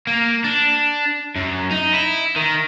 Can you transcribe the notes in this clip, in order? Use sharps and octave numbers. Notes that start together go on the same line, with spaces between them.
A#3
D4
F#2
D#4
E4
D#3